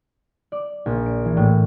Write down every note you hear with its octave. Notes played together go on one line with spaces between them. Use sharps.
D5
A#1
D7
E3
A2